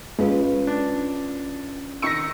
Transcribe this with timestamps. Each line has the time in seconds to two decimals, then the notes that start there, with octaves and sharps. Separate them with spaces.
0.19 G#3 C#4 F4 B4
0.67 D4
2.02 D#3 C#6 E6 A#6 C#7